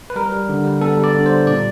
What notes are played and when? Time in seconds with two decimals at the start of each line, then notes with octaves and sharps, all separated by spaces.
0.10 B4
0.16 G3 A#4
0.32 G3
0.49 D3
0.65 G3
0.81 B3 A4
0.98 G3
1.04 D5
1.15 D3
1.26 G3 C5
1.47 A#2 D5